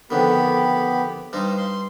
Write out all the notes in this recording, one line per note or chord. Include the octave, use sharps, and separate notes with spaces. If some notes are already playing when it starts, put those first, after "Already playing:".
F2 D3 D#3 B3 G4 B5
G2 G3 D#4 C5 D#5 F5
C6